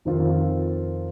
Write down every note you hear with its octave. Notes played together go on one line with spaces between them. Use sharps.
F2 D#3 C4 F4